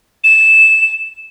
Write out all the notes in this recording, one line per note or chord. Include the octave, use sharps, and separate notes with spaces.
E7